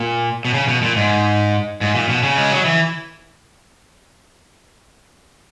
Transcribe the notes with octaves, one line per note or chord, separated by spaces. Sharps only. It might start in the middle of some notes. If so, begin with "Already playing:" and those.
Already playing: A#2
B2
C#3
B2
A#2
G#2
G#2
A#2
B2
C#3
G#3
F#3
E3